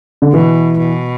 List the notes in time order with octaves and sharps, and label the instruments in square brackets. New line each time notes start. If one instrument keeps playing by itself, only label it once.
[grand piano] D3
[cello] B2 [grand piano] E3
[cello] B2